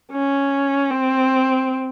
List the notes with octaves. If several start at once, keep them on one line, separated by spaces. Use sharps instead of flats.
C#4
C4